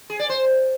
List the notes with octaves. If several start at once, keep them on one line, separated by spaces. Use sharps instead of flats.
G#4
D5
C5